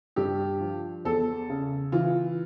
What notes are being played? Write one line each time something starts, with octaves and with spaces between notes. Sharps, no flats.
G2 G4
F3
E2 A4
C#3
E3 F4